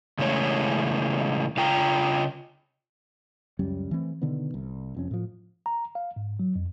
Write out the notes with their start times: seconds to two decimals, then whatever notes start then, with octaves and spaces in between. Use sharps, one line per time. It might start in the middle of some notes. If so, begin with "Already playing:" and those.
0.19 C#3 E3 G#3 A3 C#5
1.57 C#3 F4 G5 A#5
3.59 C#2 F#2 G3 C#4
3.91 E3 A3 C4
4.22 B2 D3 D#3 B3
4.54 C2
4.95 F1 F2 C#4
5.11 A2 F3
5.66 A#5
5.95 F5
6.16 G#2
6.40 F#3
6.56 F2